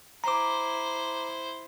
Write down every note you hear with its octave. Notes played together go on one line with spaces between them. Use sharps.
E4 C5 A#5 D6